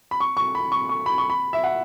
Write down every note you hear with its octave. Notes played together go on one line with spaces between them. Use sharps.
B5
C#6
C#6
B5
C#6
C#6
B5
C#6
B5
E5
F#5